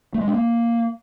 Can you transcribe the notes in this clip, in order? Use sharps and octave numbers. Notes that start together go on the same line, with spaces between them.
A3
G#3
D4
A#3